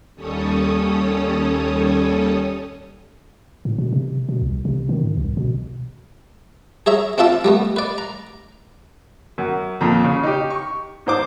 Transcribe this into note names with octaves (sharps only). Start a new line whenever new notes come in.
D#2 G3 C#4 A4 C#5 D#6
A2
B2
C3
B2
C2
C3
D#3
G#2
C2
B2
G#4 C#5 E5 A#5
C4 D4 F4 E5 A5
G3 A3 B3
B4 D5
A#5
F#2
F2 A#2
C#3
D#4 G4
C#6
G#2 C5 D6